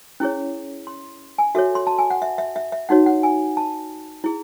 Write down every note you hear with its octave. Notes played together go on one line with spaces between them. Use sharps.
C#4 E4 G#4 C#5
C6
G#5
F#4 A4 C#5 E5
C6
A5
G#5
F#5
E5
E5
E5
E5
D#4 F#4 C#5 F#5
F#5
G#5
A5
E4 G#4